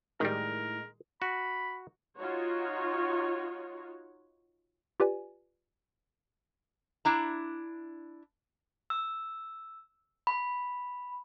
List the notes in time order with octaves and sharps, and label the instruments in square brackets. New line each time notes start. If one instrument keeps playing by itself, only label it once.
[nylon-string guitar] A2 D#4 [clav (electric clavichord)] D#3 G3 [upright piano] G#3 [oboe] A#4
[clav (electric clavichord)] F#4 [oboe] B5
[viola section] D#4 F4 F#4 C#5
[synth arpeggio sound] F4 G4 B4 D5 G#5
[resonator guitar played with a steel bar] D4 E4 A#5
[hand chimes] E6
B5